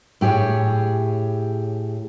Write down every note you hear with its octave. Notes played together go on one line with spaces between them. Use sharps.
A2 G4 G#4 C#5